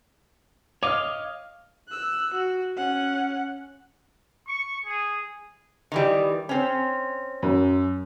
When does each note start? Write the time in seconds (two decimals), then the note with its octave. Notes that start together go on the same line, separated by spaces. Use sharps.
0.83 C#5 D#5 F5 D6 F6
1.89 E6 F#6
2.34 F#4
2.77 C#4 F#5
4.47 C#6
4.85 G#4
5.92 D#3 E3 G3
6.49 C4 C#4
7.43 F#2